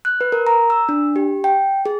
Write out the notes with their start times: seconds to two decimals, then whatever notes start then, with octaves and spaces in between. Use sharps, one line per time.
0.05 F#6
0.21 B4
0.32 A#4
0.47 A#5
0.70 E6
0.89 D4
1.16 G4
1.44 G5
1.86 G#4